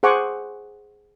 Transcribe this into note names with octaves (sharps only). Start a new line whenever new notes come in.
G#4 C5 F#5 G#5 C#6 D6